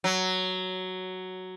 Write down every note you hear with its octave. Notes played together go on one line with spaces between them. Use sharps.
F#3